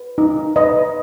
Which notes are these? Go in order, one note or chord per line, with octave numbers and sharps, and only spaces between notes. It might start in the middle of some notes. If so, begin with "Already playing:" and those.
Already playing: B4
D#4
B4 D#5